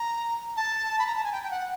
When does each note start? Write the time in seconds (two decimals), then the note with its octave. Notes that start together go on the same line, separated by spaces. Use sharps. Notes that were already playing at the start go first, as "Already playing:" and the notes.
Already playing: A#5
0.57 A5
0.99 B5
1.07 A#5
1.16 A5
1.24 G#5
1.32 G5
1.43 G5
1.51 F#5